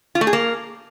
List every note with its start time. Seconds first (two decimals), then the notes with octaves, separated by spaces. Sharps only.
0.15 F4
0.21 A3
0.27 G#4
0.33 A#3